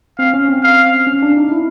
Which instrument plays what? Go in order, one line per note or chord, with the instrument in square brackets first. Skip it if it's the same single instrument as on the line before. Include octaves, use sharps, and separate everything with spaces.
[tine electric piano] C4 [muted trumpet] F5
[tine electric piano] C#4
C4
[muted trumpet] F5
[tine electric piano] C#4
D4
D#4
E4